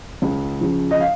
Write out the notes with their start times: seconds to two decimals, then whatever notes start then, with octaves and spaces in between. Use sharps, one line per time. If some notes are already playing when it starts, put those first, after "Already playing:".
0.22 C#2
0.61 C#3 F3
0.91 D#5
1.00 F5